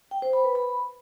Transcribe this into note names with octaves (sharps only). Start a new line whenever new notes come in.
G5
C5
B5
B4
B5